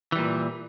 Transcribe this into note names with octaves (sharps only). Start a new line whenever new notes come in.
A#2 E3 G3